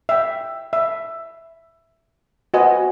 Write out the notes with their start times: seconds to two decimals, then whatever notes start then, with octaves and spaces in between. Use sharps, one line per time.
0.09 E5 G5
0.73 E5
2.54 F#4 B4 C5 D#5 G#5